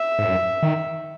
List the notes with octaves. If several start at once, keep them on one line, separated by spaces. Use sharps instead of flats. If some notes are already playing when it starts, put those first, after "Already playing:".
Already playing: E5
G#2
F#2
D#3